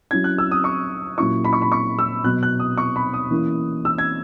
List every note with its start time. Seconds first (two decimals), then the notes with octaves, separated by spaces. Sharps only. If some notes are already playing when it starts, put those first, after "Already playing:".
0.11 F#3 C#4 E4 G#6
0.24 F#6
0.38 E6
0.51 D#6
0.64 C#6
1.18 A#2 F#3 C#4 E4 C#6
1.44 B5
1.53 C#6
1.62 B5
1.72 C#6
1.99 E6
2.24 B2 F#3 B3 F#6
2.43 F#6
2.60 D#6
2.77 C#6
2.96 B5
3.14 D#6
3.31 E3 A#3 C#4 E4
3.85 E6
3.98 G#6